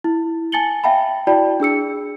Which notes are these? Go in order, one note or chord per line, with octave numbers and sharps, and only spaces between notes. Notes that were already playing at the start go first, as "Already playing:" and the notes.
E4
G#5 A5 A6 C#7 F#7 G7
E5 F5 G5 A5 B5
E4 F#4 D5 G5 A5 B5
D4 G#4 E6 C#7